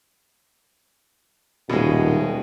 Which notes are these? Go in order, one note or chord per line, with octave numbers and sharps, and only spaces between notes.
D#1 B2 G#3